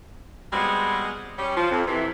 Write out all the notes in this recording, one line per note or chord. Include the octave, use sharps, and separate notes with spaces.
G3 G#3 B3 C4 F#4 G#4
G3 C#4 G4
F3
F2
C3 E3